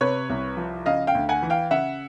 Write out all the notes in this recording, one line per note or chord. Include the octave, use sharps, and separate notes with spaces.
C3 B4 C#5
C2
F3
C#3 D#5 F5
F5 G5
D2
F#5 G#5
E3
F5 G5
C#3 E5 F#5